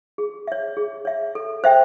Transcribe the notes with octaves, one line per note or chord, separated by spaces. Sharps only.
G#4
C#5 E5
G#4
C#5 E5
A4
C5 E5 G5